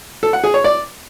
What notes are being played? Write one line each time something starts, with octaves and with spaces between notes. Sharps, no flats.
A4
F#5
G#4
C#5
D5